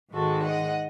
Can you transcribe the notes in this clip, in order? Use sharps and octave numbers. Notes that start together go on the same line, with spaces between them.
G#2 D#3 G#3 F#4 A4
D#5 F#5